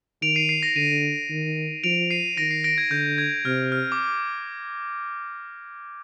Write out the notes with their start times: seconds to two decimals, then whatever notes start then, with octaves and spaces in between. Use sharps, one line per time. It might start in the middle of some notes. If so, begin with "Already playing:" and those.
0.22 D#3 D7 F7
0.35 C7 D#7
0.49 C7
0.63 A#6
0.76 D3 C7 D#7
1.30 D#3
1.84 F3 D7 F7
2.11 C7 D#7
2.37 D#3 A#6 D7
2.51 C7
2.64 A#6 D7
2.78 G#6
2.91 D3 G6
3.18 G#6
3.45 C3 F6
3.72 F6
3.92 D6